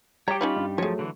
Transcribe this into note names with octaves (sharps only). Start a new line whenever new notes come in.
G3 G4 C#5 G5 A#5
C#4 D#4 F4 C#5 B5
G2
F3 F#3 A3 G#4 C#5
D3 E3